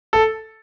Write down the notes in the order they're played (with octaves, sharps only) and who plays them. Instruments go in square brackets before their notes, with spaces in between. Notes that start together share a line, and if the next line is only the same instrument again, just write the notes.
[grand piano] A4